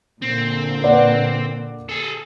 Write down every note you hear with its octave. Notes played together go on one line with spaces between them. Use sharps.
A#2 D3 C4
B4 D5 F#5
G#4 A4